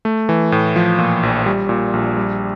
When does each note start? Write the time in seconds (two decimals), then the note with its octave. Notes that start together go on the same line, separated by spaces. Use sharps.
0.05 A3
0.29 E3
0.52 A2
0.76 F3
0.99 A#2
1.23 A#1
1.46 G3
1.69 A#2
1.93 A#1
2.17 G3